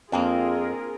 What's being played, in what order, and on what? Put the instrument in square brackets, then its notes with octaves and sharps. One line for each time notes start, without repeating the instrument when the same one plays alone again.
[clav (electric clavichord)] F2 [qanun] A#3 C4 D4 [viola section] F4 G#4 A#4